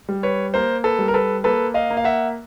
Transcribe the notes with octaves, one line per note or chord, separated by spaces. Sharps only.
G3
B4 C#5
A#3 A#4 C5
A4 B4
G3
A#4
A4 B4
A#3 A4 B4
D#5 F5
A#3
F5
E5 F#5